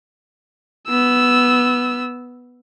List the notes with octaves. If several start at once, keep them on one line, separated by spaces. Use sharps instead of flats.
B3 E6